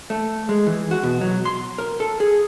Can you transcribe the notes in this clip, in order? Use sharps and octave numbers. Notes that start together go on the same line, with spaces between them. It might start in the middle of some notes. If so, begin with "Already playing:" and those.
A3
G#3
E3
F#4
B2
F#3
C6
A#4
A4
G#4